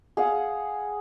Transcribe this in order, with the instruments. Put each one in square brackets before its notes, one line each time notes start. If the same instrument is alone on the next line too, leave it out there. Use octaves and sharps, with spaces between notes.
[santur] G#4 F5 F#5